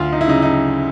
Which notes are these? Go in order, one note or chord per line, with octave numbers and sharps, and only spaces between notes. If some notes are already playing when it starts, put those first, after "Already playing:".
Already playing: D2 F4
D#4
E4
C#3 D#4
D#4